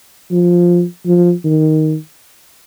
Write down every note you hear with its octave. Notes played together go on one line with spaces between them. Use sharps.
F3
F3
D#3